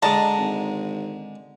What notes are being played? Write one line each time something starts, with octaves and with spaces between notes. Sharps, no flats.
D3 G#3 D#5 A5 A#5
G#1